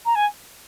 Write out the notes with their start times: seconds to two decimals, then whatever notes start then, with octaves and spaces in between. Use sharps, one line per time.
0.05 A#5
0.15 G#5